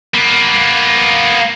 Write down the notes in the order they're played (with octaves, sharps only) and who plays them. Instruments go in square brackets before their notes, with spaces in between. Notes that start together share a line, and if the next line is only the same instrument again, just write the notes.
[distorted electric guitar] A#3 B3